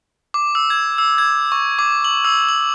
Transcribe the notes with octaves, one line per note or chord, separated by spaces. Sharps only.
D6
E6
G#6
E6
G#6
C#6
D6
F#7
E6
F#7